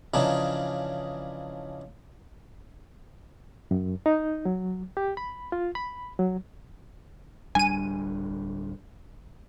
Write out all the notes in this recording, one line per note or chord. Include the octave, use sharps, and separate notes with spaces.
C#3 E3 F3 D4 D#4
F#2
D#4
F#3
G4
B5
F4
B5
F#3
D1 G3 D4 G#5 D#7